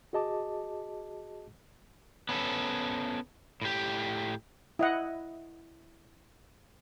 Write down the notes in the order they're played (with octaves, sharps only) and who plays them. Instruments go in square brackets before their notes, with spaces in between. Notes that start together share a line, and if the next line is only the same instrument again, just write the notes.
[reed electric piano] F#4 G#4 D#5 A5 D6
[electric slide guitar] B3 C#4 A4
A2 G4
[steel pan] E4 D#5 F#5